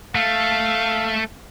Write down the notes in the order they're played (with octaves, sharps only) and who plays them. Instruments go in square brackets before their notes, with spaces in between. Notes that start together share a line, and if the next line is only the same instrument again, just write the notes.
[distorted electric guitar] A3 [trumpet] F5